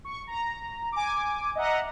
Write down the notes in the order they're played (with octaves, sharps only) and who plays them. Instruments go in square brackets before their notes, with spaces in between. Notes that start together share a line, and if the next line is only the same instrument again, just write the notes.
[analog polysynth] C#6
A#5
G#5 D6
D#5 E5 F#5 A#5